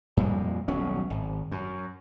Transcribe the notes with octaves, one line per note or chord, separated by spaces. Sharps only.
F2 A#2 G3 G#3
D#1 B1 F#3 C#4
G#1
F#2